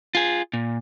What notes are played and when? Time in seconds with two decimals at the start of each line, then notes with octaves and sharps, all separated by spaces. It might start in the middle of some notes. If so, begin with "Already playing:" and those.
0.15 F4 G#4
0.53 A#2